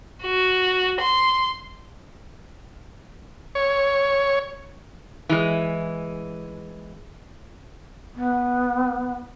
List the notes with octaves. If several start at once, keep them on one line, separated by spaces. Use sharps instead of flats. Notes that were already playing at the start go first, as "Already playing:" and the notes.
F#4
C6
C#5
E3 G#3
B3